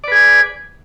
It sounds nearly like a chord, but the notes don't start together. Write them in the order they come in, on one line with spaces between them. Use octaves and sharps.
D5 B4 G#4 G#5